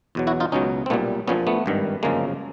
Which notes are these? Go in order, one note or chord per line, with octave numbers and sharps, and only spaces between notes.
E2 B2 F#3
E4 F#4
D#4 F4
C#2 B2 F#3 C#4 D#4
C4
B1 A#2 G3 A3 B3
A#1 A#2 F3 B3 C#4
A3 B3
G#1 G2 D#3
G1 F#2 C#3 F3 G#3 A#3